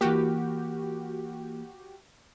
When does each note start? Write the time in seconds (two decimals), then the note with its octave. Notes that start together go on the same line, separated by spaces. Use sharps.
0.01 E3 A#3 F#4 G4